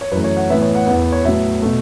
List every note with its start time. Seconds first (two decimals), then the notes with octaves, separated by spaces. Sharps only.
0.01 C#5
0.12 F#2 E3 A3 B4
0.24 C#5
0.37 F#5
0.50 A2 E3 B3 E5
0.62 C#5
0.75 F#5
0.86 E2 E3 B3 F#5
0.99 B4
1.12 C#5
1.24 A2 F#3 B3 E5
1.62 B2 A3